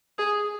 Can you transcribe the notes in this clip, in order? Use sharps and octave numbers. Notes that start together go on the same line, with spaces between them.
G#4